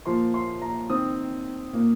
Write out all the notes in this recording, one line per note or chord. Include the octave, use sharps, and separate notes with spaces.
A#2 F3 A#3 C6
C6
A#5
D#3 C4 D#6
A#2 A#3